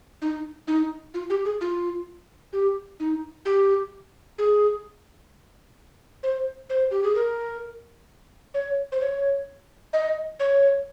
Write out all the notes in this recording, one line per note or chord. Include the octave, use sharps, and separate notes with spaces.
D#4
D#4
F4
G4
G#4
F4
G4
D#4
G4
G#4
C5
C5
G4
G#4
A#4
C#5
C5
C#5
D#5
C#5